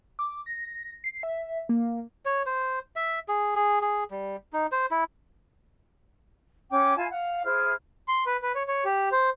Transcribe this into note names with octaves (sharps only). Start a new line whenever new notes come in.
D6
A#6
C7
E5
A#3
C#5
C5
E5
G#4
G#4
G#4
G3
D#4
C5
E4
C#4 G5 D6
E4 F4 G#5 A5
F5 F#5
E4 G#4 C5 F6
C6
B4
B4
C#5
C#5
G4
C5